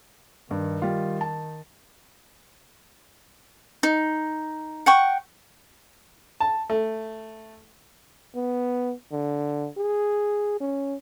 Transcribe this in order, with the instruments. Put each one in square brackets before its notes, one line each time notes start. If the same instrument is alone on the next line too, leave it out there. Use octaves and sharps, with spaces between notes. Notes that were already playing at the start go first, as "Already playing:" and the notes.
[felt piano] G2 [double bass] D#3
[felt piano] G3 F4
A5
[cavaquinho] D#4
F#5 G5 C#6
[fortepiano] A5
A3
[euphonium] B3
D3
G#4
C#4